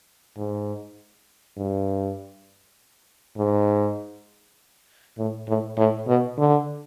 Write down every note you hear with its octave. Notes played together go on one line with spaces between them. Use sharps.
G#2
G2
G#2
A2
A2
A2
B2
D3